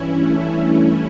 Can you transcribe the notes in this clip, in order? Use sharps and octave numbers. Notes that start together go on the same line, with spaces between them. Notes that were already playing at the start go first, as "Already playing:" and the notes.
Already playing: G2 E3 C#4 E4
A3 C#4